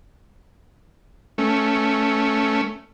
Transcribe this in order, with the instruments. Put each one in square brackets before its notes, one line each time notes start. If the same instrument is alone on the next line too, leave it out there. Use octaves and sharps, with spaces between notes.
[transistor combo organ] A3 C#4